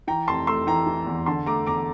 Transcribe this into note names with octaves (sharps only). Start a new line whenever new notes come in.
E3 G5 A#5
F1 A5 C6
A3 C6 E6
E3 G5 A#5
E3
E2
D3 A5 C6
A3 A#5 D6
E2 A#5 D6